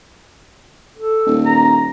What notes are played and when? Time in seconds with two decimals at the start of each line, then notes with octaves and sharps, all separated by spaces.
0.96 A4
1.26 D#1
1.45 A#5